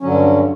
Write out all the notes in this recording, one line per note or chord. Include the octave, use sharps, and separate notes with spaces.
G2 D3 F#3 C#4